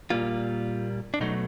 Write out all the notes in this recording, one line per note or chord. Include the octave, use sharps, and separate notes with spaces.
A#2 G3 A#3 F4
D4
B2 F#3 A3 D#4